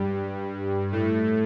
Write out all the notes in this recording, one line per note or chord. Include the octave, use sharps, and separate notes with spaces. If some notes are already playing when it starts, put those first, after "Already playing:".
Already playing: G2 G3
A2 A3